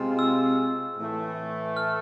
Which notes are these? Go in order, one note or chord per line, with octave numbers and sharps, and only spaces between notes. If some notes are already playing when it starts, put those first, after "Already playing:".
Already playing: C3 G#3 C4 F4
E6
A2 E3 A3
F6